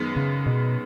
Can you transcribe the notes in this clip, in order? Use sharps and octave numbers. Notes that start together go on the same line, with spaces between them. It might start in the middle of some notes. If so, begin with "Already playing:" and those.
Already playing: F#2 D#3 G#3 B3
C#3
B2